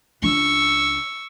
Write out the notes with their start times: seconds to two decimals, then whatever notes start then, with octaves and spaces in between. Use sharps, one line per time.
0.22 C#2 D4 C#6 E6